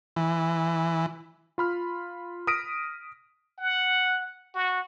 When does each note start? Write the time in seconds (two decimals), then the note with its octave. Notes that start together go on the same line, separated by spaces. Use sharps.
0.16 E3
1.58 F4 B5 F6
2.47 D#6 F6 A#6 B6 D7 D#7
3.58 F#5
4.55 F#4